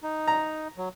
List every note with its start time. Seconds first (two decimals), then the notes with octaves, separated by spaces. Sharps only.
0.03 D#4
0.28 A#5
0.78 F#3